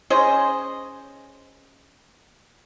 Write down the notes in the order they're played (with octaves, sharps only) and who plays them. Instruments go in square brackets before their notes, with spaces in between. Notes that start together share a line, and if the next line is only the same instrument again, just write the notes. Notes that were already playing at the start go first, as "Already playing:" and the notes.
[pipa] C#4 G#4 C5 D#5